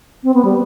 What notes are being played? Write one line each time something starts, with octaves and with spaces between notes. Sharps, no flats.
C4
B3
G3